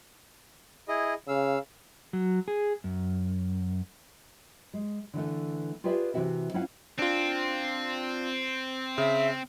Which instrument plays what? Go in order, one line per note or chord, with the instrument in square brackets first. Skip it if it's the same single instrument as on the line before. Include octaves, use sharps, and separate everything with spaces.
[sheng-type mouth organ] E4 G#4 D#5
[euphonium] C#3 [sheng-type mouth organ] F5 E6
[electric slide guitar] F#3
G#4
F#2
[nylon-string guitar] G#3
D3 E3 G#3 A3
F4 G4 G#4 B4 D5 E5
C3 E3 E4 F#4 E5
C#4 E4 F4 F5 F#5
[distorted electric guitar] C4 [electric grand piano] D4 F4
[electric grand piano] C#3 [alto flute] E5